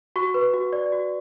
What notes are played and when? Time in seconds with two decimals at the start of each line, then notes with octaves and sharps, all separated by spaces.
0.16 F#4 C#6
0.34 B4
0.54 F#4
0.73 D5
0.92 F#4